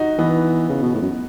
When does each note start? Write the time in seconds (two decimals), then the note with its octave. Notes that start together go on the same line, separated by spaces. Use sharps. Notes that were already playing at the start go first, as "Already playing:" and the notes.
Already playing: D#4 F#4
0.18 E3 B3
0.69 C#3
0.82 B2
0.95 A2
1.02 F#2